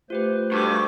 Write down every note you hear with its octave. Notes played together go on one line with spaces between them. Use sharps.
A3 F4 G4 B4 C5
G2 F#4 A4 C#6 D6